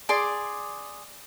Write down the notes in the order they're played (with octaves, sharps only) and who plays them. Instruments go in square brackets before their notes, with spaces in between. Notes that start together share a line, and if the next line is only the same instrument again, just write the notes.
[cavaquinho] G#4 D5 C6 D6